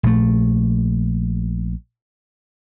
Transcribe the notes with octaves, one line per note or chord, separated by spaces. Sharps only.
A#1 A3